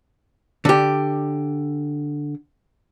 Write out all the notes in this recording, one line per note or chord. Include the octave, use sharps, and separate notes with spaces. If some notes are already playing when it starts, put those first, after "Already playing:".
D3 G4